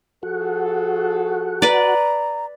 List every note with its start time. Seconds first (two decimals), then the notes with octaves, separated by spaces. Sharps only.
0.23 F3 F#4 G#4 A4
1.62 B4 D5 A#5